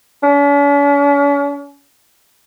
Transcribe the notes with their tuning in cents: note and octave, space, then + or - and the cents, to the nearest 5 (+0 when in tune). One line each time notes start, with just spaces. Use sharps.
C#4 +45